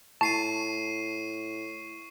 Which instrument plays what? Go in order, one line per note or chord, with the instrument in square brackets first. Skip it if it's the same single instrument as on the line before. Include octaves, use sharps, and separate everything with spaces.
[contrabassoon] A2 [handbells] A5 [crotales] C#6 C7 D#7